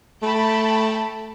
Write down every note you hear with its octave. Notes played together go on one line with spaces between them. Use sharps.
A3 G5 A5 B5